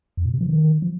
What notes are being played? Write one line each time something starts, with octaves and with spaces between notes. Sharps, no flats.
F2
A#2
C3
F3
D#3
F3